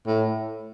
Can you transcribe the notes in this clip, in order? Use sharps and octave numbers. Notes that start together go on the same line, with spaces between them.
A2